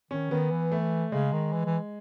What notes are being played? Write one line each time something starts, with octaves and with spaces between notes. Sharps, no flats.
D#3 C#4
D#3 B3
E3
A3
C#3 G#3
D#3
E3
E3